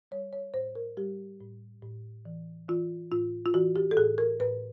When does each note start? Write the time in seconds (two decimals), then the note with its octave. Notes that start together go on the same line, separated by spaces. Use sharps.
0.11 G3 C#5
0.33 C#5
0.54 A2 C5
0.75 A#4
0.97 G3 G4
1.40 A2
1.83 A2
2.25 E3
2.69 E3 F4
3.11 A2 F4
3.46 F4
3.54 E3 F#4
3.76 G4
3.91 A4
3.97 A2 G#4
4.18 A#4
4.40 A2 B4